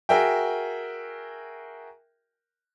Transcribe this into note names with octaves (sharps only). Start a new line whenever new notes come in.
F#4 G#4 A#4 E5 G5